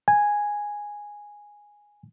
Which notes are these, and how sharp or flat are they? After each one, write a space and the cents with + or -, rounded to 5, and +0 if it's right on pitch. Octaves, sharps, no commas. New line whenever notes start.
G#5 -5